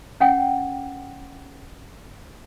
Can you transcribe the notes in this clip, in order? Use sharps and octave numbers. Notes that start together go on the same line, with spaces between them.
C#4 F#5 G5